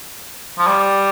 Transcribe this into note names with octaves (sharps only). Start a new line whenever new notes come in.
F3
G3